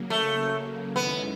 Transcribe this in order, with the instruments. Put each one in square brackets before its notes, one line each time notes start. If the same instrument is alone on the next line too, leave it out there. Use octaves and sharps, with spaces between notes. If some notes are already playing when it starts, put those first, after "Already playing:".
Already playing: [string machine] C#3 F#3 A#3
[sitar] A3
[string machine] F#2 D#3 G#3 C#4 E4 [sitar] B3